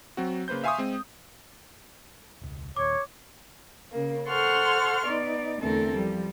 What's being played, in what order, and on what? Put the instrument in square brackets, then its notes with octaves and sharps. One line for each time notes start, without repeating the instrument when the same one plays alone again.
[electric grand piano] F#3 C4 F#4
C#3 A#3 B4 C5 G6
E5 F5 G#5 C6 C#6 D#6
G#3 C4
[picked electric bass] E1 C#2
[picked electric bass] D#1 D#2 [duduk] C#5 [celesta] D6
[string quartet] C#3 A#3
A4 C5 F#5 C6 C#6 F6
B3 D#4 D5
E2 D3 A3 C4 A4 A#4
F3 G3